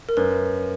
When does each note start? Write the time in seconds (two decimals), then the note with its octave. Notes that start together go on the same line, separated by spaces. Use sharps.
0.09 A#4
0.17 F#2 B4